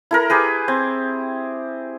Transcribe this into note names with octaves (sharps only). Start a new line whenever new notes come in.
E4 A4 A#4
G4 G#4 B4
C4